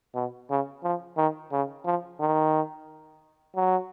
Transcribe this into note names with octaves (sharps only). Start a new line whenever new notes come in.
B2
C#3
F3
D#3
C#3
F3
D#3
F#3